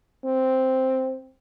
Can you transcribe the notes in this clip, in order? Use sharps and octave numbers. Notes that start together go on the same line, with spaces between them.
C4